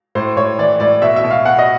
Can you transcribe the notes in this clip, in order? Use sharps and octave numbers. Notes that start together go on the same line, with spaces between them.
A2 C5
A2 C#5
E3 D5
A2 D5
B2 E5
E5
B2
F5
B2 F#5
D#5